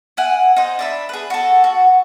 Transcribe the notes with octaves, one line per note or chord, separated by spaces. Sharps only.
E4 F#5 G#5
D#4 C5
D4 E5 B5
G#4 B4
F#4 A4
F#4